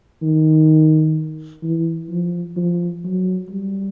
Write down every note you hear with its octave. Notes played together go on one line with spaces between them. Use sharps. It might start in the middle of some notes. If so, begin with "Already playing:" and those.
D#3
E3
F3
F3
F#3
G3